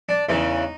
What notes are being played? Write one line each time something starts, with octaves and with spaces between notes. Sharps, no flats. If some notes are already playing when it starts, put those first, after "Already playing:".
D4
E2 C#3 E3 D#4